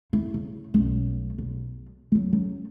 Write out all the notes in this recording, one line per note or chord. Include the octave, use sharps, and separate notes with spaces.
E4
C#3
B1 F#2
B1
E2 F#3
F#2